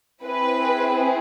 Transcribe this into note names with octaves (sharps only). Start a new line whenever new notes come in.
C4 E4 G#4 B4